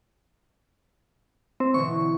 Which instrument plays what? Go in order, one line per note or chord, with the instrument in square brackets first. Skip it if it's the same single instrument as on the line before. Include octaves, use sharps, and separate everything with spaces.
[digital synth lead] C4
[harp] B2 D3 E3 [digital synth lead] C#6